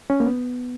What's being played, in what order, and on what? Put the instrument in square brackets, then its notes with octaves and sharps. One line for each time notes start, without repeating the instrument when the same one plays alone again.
[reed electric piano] C#4
A#3
B3